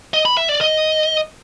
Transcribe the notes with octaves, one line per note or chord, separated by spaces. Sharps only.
D#5
B5
E5
D5
D#5